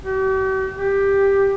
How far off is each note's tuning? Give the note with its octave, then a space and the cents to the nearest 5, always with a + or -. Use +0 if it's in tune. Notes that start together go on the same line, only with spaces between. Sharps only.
G4 -45
G4 +10